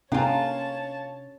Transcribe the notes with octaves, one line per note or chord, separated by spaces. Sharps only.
C3 A#3 C#4 D4 F4 C#5 A5